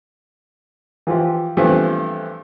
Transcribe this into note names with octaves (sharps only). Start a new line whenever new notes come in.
E3 F3 F4 G4
G2 E3 F3 A3 B3 C4